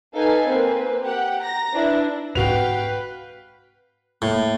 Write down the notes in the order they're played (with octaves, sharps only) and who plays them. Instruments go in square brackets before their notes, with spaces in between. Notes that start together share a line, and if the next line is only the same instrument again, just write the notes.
[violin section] D#4 A4 B4 F5 G#5
A#3 C4 B4
G4 F#5 G5
A#5 A#6
D4 E4 B4
[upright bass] G#2 C4 [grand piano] F#4 F7 [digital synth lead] B4 [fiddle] F5 G5
[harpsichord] A2 [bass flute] A#3